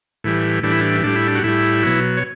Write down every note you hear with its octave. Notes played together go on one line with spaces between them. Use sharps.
A2 E3 G3
A2 E3 G3 D4
E4
D4
A2 G3 D4
E4
D4
F#4
A2 G3 E4
B2 F#3
C#5